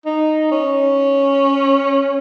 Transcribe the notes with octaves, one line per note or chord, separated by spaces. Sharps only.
D#4
C#4